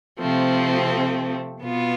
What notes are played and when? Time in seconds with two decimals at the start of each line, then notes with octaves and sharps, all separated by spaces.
0.19 C3 F3 A3 C4
1.61 B2 B3 F4